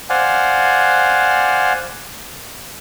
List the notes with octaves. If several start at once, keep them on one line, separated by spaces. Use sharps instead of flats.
C5 D5 F5 F#5 G#5